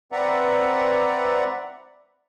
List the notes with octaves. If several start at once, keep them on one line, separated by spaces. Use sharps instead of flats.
C4 B4 D5 E5 F#5 A#5